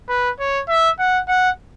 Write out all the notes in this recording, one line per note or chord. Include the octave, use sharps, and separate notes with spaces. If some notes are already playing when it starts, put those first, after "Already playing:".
B4
C#5
E5
F#5
F#5